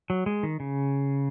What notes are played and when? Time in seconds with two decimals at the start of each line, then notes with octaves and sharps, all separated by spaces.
0.10 F#3
0.26 G#3
0.43 D#3
0.60 C#3